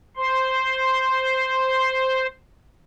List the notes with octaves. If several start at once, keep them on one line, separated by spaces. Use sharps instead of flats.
C5 C6